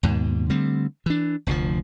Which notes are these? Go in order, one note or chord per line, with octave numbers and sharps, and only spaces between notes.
D#2 G#2 B2
D3 G3 A3 C4
E3 D4
F1 D2 B2 F3